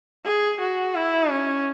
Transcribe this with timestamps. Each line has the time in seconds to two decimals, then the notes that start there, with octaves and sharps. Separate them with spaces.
0.25 G#4
0.61 F#4
0.95 E4
1.30 C#4